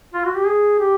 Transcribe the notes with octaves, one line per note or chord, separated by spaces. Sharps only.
F4
F#4
G4
G#4
G4